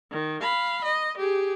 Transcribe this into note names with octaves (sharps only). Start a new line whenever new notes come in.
D#3
F5 B5
D#5
G4 G#4